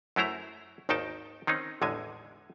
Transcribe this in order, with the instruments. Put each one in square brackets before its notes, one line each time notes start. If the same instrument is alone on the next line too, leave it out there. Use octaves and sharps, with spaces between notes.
[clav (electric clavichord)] F#2 F#3 A3 E4 C5 A#5
G#1 D#2 D#3 D#4 G5 A5
D#3 C4 C#4 D#4
A1 E2 D3 G#3 G#5